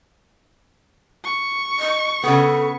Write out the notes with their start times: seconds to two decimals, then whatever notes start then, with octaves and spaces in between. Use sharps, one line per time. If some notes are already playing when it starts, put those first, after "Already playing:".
1.24 C#6
1.79 D#5
2.24 C#3 B3 A4